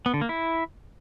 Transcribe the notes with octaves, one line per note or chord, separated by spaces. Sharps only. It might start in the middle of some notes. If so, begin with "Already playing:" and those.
B3
D3
A#3
E4